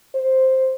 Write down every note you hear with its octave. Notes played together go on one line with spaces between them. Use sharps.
C5